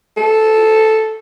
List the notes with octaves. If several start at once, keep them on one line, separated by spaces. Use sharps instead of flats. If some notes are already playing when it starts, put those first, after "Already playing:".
A4